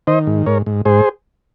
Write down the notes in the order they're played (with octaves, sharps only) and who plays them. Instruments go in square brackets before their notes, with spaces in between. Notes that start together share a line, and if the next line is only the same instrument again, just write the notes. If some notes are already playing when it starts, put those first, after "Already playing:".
[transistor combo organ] D#3 C5 D#5
G#2
G#2 A#4 C#5
G#2
G#2 G#4 C5